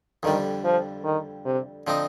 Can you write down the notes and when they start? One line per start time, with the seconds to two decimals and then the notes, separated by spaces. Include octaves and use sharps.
0.23 F2 D3 D#3 G3
0.64 F3
1.04 D#3
1.45 C3
1.87 D3 F3 C4 D#4